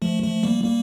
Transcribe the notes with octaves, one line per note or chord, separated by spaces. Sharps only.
F3 A3
F3 A3
G3 A#3
G3 A#3